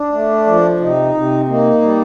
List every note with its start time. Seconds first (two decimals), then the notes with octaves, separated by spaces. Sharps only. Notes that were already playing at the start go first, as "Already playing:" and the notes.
Already playing: D4
0.12 A3
0.46 F3
0.80 C3 D#4
1.15 C3
1.48 A#3 D#4
1.82 G3